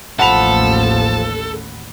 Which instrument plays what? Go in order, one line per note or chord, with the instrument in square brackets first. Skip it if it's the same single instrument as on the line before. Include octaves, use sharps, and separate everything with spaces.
[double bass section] A1 D#2 [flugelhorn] F3 [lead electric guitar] A4 [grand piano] F#5 B5 F7